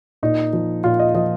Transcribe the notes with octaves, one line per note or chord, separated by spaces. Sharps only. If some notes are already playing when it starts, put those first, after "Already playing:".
A#2 D#4
F3
A#2 F4
D#5
F3 D#5